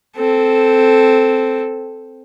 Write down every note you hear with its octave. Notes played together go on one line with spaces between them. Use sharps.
C4 A4